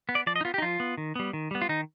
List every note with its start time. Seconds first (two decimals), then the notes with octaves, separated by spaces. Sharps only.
0.09 B3
0.15 D5
0.27 F3 D5
0.36 D#5
0.41 D#4
0.45 B3 F4
0.54 G4
0.58 D#4
0.62 F3 F4
0.80 B3
0.98 D#3
1.15 G3 B3
1.33 D#3
1.51 G3 B3
1.61 F4
1.69 D#3 D#4